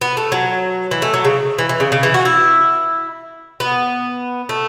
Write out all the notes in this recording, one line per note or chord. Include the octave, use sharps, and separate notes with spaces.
B3
A3
F#3
E3
A3
F#3
C#3
E3
E3
C#3
C#3
E3
F#4
E4
B3
A3